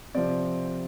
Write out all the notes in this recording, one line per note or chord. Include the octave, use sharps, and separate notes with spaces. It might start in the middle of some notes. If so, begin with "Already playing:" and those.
C3 F3 D5